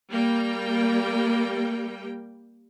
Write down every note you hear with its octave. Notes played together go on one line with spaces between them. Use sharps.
G3 A#3 G5